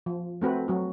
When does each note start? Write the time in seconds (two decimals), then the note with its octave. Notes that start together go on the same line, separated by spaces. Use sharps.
0.06 F3
0.42 A3 C4 F#4 B4
0.68 F#3 F#4